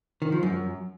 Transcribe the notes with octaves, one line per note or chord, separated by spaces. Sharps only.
D#3
F3
F#2